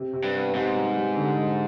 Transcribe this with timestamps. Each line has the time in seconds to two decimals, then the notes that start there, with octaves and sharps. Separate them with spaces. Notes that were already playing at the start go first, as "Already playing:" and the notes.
Already playing: C3
0.13 C3
0.24 G2
0.34 B3
0.54 G#2 C3
0.75 G3
0.96 G3
1.16 D3
1.37 G#3